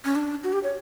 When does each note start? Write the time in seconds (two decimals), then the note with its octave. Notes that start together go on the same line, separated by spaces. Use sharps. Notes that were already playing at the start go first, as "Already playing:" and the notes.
0.05 C#4
0.15 D4
0.44 F#4
0.53 G4
0.63 C#5